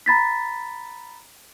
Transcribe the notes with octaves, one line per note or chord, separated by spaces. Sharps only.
A#5 B5 A6 B6